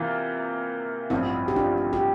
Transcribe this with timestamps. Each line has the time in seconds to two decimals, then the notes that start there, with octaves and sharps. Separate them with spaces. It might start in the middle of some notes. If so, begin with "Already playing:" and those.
Already playing: C3 E3 A#3 F4
1.10 A1 G2 F3 C4 E4
1.48 G4
1.56 D4 F4
1.93 G4